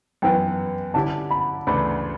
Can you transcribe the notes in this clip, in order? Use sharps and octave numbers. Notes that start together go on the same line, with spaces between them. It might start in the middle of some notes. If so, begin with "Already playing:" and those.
F#2 E3 B3 E4 B4 G5
D3 G3 C#4 E4 G4 A5
B5
D2 C#3 E3 A3 D4 B5